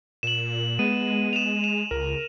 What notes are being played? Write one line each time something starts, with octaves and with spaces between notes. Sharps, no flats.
A#2 E7 F#7
G#3 B3 D#7
E7 F7
E7
C#2 A#4